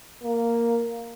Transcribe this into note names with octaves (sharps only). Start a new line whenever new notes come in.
A#3